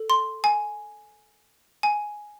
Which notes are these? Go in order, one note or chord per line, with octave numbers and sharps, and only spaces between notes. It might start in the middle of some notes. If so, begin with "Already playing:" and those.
Already playing: A4
C6
G#5
G#5